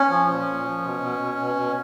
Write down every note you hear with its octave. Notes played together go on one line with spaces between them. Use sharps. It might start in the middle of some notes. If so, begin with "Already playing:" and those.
Already playing: C#4
F3
A#2
A#2
F3
B2
B2
B2
B2
B2